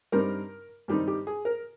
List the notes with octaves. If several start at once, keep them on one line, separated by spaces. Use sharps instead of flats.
G2 G3 C4 D#4 A#4
G2 D#3 G3 C4 D#4 G4
G4
G#4
A#4